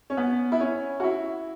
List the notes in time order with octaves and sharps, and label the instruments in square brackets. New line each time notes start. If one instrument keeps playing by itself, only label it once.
[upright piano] C#4
B3
E4
C#4
F#4
E4